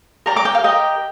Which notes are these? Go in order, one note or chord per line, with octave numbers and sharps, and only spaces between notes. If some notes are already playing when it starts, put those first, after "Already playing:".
G4 A#4 D5 A#5
D6
G5
F5
G4 A#4 D#5 G5